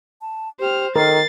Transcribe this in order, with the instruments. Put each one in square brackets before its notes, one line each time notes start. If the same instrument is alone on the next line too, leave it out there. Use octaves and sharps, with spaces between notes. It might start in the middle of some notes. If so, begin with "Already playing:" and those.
[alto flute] A5
[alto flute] G4 [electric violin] C5 F6
[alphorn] D#3 [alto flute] A4 [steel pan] A#4 [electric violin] A6 C7